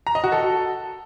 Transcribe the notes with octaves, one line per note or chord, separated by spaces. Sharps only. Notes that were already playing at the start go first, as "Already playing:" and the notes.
A#5
D#5
F#4
A4